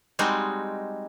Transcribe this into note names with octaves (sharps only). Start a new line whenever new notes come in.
G3 G#3 C4 D#4 F#4